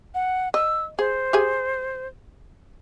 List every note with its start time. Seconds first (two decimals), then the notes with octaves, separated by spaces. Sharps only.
0.15 F#5
0.54 D#5 E6
0.99 G#4 C5
1.33 G4 G#4 G#5